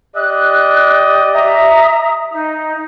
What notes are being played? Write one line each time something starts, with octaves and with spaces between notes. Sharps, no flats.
G4 D5 D#5 F#6
E5 A#5 D#6
D#4